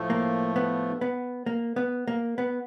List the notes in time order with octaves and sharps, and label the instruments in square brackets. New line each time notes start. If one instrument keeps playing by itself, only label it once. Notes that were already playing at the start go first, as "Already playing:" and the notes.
Already playing: [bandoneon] A2 F3 A3
[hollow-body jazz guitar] A#3
B3
B3
A#3
B3
A#3
B3